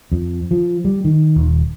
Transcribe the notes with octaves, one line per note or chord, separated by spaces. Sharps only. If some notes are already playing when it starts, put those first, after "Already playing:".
F2
F3
G3
D#3
D#1